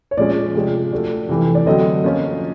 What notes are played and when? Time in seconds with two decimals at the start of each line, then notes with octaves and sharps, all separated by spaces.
0.11 C#5
0.17 A#2 F3 G#3 C#4 D5
0.54 C3 F3 G#3
0.92 F3 A3 D4 F#4
1.29 C3 E3 A3
1.55 D5
1.66 D3 F#3 A3 C4 D#5
2.04 F3 A#3 C#4 F4